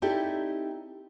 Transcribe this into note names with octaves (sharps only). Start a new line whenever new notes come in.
C4 D#4 E4 G4 A4 D5